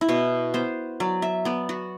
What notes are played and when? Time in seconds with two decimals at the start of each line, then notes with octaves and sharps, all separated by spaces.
0.01 E4
0.09 B2 F#4
0.54 B3 C5
1.00 F#3 D5
1.22 E5
1.45 B3 D5
1.69 F#4